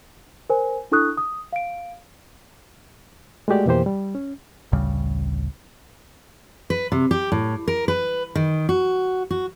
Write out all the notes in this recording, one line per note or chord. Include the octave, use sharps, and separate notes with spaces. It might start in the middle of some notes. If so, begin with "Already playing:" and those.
A#4 C5 G#5
D4 E4 A4 C#6 D#6 F#6
D#6
F5 D7
G#3 A3 F#4 G4 D5
F2 B2 E3 A#3 G4 C5
G3
C#4
A1 D2 C#3 G3
B4
C3
G4
A2
A#4
B4
D#3
F#4
F#4